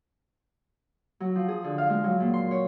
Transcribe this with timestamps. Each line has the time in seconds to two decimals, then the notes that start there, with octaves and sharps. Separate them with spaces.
1.20 F#3
1.35 F3
1.48 G#4
1.64 D3
1.78 F5
1.90 G#3
2.04 F#3
2.20 A#2
2.34 C6
2.51 C#5